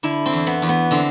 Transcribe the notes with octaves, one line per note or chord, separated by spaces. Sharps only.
D3 E4
C4
E2
B3
E2
B3
D3 C4